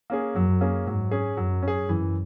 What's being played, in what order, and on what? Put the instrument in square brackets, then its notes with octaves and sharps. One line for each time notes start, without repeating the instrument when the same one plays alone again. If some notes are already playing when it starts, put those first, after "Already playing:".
[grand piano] A#3 C#4 G#4
[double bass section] F#2 [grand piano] F#3
[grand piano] A#3 C#4 G#4
[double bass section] G#2 [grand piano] F#3
[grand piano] C#4 G#4
[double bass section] F#2 [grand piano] F#3
[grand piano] C#4
G#4
[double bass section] F#2 [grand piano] E3